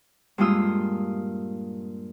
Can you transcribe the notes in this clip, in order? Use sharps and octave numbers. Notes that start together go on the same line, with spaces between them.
G2 A#2 G#3 F4 D#6 E6